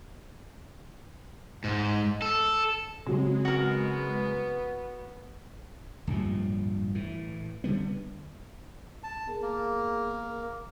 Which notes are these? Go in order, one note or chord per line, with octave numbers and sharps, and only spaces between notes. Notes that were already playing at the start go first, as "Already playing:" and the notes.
G#2
A4
C#3 F#3 G#3 C4
B3 F#4 A#4
D1 G2 A#2 F3
A2 E3
D3 G3 B3
A5
B3 G#4 A#4
A#3
A#4